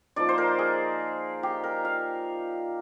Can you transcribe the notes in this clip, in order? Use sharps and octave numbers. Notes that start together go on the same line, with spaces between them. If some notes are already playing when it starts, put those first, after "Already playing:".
F3 A#3 D#4 D5
C5
A#4
G#4
G4
A#4
F5